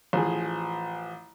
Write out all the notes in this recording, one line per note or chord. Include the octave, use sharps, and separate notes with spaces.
A1 F3 G#4